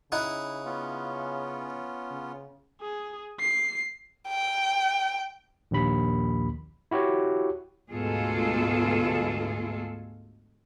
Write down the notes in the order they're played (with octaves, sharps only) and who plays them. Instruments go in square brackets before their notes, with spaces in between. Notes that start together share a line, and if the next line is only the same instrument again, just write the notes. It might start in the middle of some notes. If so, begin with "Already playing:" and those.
[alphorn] C#3 [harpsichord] D#4 E4 F#5
[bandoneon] B3 C#4 F4
[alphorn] C#3
[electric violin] G#4
C7
[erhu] G5
[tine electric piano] A#1 D#2 B5
E4 F#4 G4 C#5
[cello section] D2 G#2 B2 F4 G#4 A4